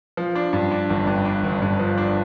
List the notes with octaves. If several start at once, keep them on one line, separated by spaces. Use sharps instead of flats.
F3
D4
G2
D4
G1
G2
D4
G1
G2
F3
D4